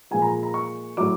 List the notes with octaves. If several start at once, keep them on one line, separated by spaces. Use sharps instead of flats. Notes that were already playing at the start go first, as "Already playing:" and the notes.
A#2 F3 G#3 G#5
A#5
A#5
C#6
A2 F#3 D6